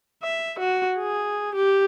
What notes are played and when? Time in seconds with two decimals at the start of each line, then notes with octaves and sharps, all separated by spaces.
0.23 E5
0.59 F#4
0.98 G#4
1.55 G4